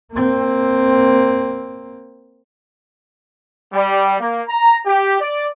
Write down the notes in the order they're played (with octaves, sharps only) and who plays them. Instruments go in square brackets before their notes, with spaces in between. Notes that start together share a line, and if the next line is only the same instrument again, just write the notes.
[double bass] A#3 C4
[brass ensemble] G3
A#3
A#5
G4
D5